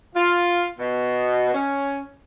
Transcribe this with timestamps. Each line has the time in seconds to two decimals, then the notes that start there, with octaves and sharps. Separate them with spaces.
0.15 F4
0.79 B2
1.54 C#4